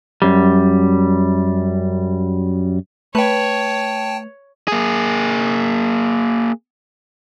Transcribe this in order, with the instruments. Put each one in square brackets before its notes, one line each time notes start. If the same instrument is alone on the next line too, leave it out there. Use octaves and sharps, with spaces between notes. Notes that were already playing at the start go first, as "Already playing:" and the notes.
[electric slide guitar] F#2 G3
[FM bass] A3 [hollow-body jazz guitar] B4 [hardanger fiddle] C#5 [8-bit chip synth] G5 A5
[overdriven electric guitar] A#3 G#4